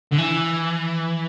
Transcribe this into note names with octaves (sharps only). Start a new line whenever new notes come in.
D3
E3